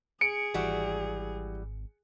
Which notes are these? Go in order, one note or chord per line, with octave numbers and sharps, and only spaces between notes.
G#4 C#7 D7
G#1 E3 G3 F#4